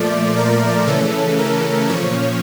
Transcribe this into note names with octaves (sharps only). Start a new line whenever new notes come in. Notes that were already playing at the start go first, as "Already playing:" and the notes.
Already playing: A#2 F3 A3 D5
A#4
C#3 E3 A3 C#4 A4
A#4
A#2 F3 C#4 C#5